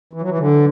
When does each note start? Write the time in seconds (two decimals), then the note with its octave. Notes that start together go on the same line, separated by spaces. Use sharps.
0.13 E3
0.22 F#3
0.29 E3
0.38 D3